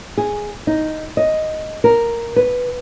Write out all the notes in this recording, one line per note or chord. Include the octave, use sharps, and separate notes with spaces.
G#4
D#4
D#5
A#4
B4